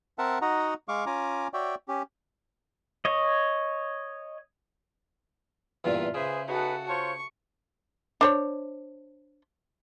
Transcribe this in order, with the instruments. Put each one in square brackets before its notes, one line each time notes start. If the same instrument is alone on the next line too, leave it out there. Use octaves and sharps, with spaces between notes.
[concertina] C4 A#4 E5 F#5 A5
D#4 F#4 D#5 F#5 A#5
G#3 F5 C#6 D6
C#4 F4 G#5 A#5 D6
F#4 C#5 D5 E5 G5
C#4 G4
[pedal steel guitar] C#5 D#5
[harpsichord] E2 G2 A#2 [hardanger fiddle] F4 E5
[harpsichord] C#3 [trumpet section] G#4 B4 C5 [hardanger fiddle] E5
[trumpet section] D#4 G#4 B4 [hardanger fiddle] F#4 A4
[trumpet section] F4 C5 C#5 [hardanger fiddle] C#6
[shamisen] D4 C5 C#5